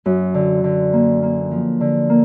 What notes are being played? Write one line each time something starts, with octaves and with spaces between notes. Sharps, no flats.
F#2
D3
D3
A#3
A#3
F3
D3
A#3